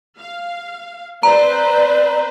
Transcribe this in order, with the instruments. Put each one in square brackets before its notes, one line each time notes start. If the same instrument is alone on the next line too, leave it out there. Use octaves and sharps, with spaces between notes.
[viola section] F5
[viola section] C4 B4 C5 [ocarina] D5 [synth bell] A#5